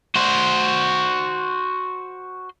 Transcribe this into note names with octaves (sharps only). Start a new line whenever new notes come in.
F#4 C5